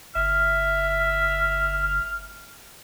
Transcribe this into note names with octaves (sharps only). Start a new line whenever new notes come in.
G1 E5 F6